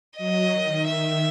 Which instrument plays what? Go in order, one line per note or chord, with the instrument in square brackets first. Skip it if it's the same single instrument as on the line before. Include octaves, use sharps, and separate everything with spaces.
[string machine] F#3 [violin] D#5
[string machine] D#3
[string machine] D#3 [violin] E5